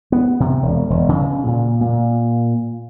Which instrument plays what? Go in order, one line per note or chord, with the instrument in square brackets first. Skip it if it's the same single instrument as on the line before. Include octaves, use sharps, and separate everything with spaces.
[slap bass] B3
C3
E1
E1
C#3
A#2
A#2